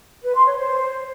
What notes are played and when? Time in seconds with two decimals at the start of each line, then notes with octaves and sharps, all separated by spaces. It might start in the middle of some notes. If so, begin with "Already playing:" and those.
0.23 B4
0.35 C6
0.46 C#5
0.58 C5